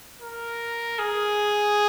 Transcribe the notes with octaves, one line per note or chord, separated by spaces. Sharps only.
A#4
G#4